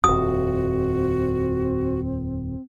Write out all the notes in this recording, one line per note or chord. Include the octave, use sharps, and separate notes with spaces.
D#1 F2 C4 F#4 D#6